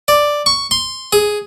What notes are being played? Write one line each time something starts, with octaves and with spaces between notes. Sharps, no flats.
D5
C#6
C6
G#4